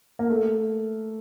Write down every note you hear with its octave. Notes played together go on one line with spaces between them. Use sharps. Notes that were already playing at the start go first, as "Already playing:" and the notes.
A#3
A3